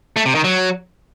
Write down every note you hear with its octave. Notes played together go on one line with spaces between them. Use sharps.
A3
C3
D#3
F#3